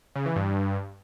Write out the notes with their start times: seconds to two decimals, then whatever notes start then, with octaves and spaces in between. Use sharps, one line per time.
0.15 C#3
0.26 E3
0.36 G2